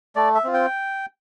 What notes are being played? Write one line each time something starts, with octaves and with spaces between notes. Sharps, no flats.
A3 D5
E5
C4 F4
G5